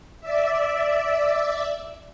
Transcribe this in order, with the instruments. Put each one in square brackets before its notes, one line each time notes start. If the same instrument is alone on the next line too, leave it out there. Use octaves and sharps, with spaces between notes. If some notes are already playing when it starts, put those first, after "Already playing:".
[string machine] D5 E5